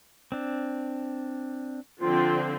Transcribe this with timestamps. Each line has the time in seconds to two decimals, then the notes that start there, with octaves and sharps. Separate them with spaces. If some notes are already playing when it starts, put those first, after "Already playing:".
0.32 C4 D4
2.01 D3 F3 C4 F4